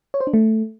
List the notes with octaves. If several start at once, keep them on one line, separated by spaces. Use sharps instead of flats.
C#5
C5
D4
A3